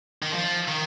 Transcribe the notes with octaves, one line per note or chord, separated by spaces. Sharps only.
D#3
F3
D#3